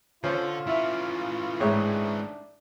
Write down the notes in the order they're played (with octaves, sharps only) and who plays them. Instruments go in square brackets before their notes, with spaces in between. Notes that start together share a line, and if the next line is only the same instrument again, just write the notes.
[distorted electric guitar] D3 [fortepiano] F3 C#4 [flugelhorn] F4
[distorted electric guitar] E3 C#4 [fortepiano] E4 E5
[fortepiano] A1 C#5 [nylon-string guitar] G#2 C4 G#4 [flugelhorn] D4